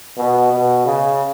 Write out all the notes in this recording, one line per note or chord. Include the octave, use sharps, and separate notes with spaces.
B2
B2
C#3